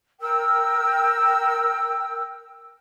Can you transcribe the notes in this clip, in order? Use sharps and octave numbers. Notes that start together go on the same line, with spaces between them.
A#4 G5 E6